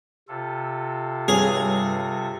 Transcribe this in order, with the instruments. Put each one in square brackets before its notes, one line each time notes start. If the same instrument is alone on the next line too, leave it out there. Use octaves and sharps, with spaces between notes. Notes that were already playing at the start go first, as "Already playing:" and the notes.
[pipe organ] C3 F4 A4
[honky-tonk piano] G2 C#5 F7 [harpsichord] G#4